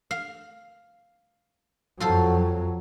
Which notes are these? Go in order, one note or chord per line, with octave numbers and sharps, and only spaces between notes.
F5
F2 F#3 F4 A4 C5